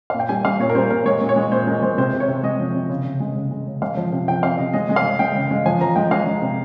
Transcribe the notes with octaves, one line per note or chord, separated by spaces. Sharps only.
A#2 F5
G5
G3 G#5
G3 F5
A#2 C#5
A#4
G3 C5
A#2 A#4
G#3 C#5
A#2
C#5
G#3
A#2 C5
G#3 A#4
G#3 C5
C3 C5
C3
C#5
C3
G#3 D#5
F3
C3
C#3
C#3
G#3
C#3
G#3
C#3
G#3 F5
F3
C3
F3 G5
C3 F5
C3 D#5
G#3 D#5
G#3
F5
G#3
G#3 G5
C#3
G#3
F3 G#5
F3 A#5
G#3 G5
G#3 F5
G#3
C3